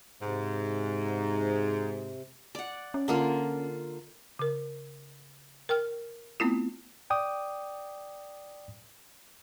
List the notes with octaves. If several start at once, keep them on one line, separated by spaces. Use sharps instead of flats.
G#2 C3
D5 F#5
C#4
D3 A#3 F4
C#3 A#4
A#4 G5 F6
A3 B3 C4 E4 F4
D5 G5 D6 D#6